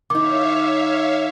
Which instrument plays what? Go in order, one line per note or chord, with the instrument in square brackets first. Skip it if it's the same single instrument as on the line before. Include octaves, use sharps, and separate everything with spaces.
[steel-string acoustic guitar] D#3 D#4 [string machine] C#5 E5 F5 [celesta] D6